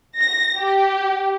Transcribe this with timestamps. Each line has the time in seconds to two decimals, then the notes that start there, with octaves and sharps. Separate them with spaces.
0.19 A#6
0.58 G4